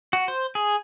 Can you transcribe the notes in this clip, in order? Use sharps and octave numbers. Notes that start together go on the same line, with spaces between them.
F#4
C5
G#4